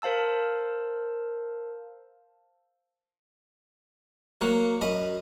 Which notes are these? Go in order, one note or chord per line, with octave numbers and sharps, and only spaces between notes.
A#4 C5 F5 A5 E6
F#3 A#3 F#5
F#2 D#5 B5